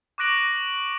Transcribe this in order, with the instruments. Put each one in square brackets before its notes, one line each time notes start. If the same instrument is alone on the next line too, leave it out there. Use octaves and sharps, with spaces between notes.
[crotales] C#6 D6 F#6 A#6 D7 F#7